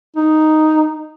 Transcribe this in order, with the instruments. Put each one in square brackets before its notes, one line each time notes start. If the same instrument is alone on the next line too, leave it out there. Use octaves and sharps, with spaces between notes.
[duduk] D#4